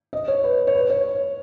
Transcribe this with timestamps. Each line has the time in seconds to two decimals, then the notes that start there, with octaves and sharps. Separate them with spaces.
0.13 D#5
0.28 C#5
0.44 B4
0.67 C#5
0.74 B4
0.90 C#5